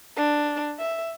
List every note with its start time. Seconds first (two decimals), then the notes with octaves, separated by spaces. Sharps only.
0.17 D4
0.79 E5